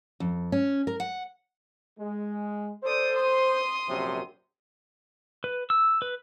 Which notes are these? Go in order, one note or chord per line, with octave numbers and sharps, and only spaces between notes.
F2
C#4
A#4
F#5
G#3
A4 C5 D5 D#6
C6 D#6
A#1 F#2 C3
B4
E6
B4